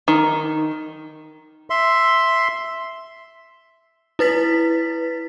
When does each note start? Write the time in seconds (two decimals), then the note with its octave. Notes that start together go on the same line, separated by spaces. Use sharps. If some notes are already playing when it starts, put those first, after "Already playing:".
0.08 D#3
1.70 E5 C6
4.19 E4 B4 A6 B6